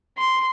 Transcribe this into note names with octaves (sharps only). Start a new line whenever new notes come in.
C6